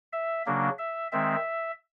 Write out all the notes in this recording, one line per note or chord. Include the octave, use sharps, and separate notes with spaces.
E5
C#3 F#3 A#3 D4
E5
D#3 G#3 C4 E5